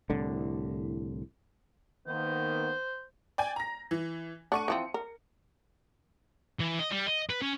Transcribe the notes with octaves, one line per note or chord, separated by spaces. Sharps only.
C2 A2 D3
D#3 A#3 B3 C5
D5 G5 G#5
A#5 A#6
E3
A3 D4 F#5 C#6 D#7
E3 F3 C4 C#7
A#4
E3
D#5
G3
D#5
B4
C#4